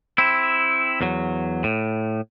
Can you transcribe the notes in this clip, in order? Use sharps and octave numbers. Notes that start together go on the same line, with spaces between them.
C4 E4
E2 F#3
A2